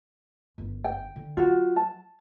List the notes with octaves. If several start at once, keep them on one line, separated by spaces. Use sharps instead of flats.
G1 F#2
G5
D3
F#3 F4 F#4
A5